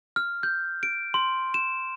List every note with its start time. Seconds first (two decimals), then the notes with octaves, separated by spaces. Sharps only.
0.16 F6
0.43 G6
0.83 D7
1.14 C6
1.54 E7